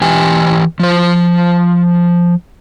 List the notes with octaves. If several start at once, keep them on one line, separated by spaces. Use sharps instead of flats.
E3 G4 G5 G#5
F3 C5